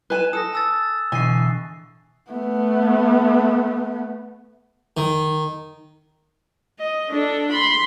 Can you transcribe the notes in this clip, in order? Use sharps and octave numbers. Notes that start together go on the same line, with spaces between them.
B4 G#5 F#6 E7
A4 D#6 A#6
G#5 E6 A6
B2 D3 E3 G#5 C#6 C7
A3 B3
D#3
D#5
D4 A4
B5 C6